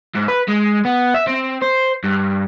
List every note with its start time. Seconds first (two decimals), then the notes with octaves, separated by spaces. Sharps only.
0.15 G#2
0.28 B4
0.48 G#3
0.85 B3
1.14 E5
1.27 C4
1.62 C5
2.04 G2